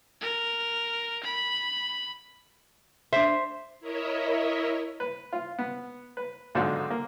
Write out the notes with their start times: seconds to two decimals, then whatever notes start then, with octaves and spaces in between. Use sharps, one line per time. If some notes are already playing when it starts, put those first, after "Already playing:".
0.21 A#4
1.23 B5
3.13 D4 C5 E5
3.80 E4 A#4 C#5 D#5 E5
5.00 B4
5.33 F4
5.59 B3
6.17 B4
6.55 B1 G#2 D3 F4 F#4 C5
6.90 A#3